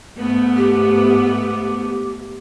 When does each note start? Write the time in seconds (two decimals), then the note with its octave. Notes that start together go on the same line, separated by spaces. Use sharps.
0.18 G#2 A3 B3
0.57 G4